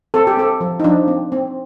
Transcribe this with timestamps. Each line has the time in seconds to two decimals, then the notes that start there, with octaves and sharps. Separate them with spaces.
0.14 C4 A4
0.27 G4
0.37 C4 A4
0.61 F3
0.80 D#4
0.84 F3 D4
1.08 C4
1.32 C4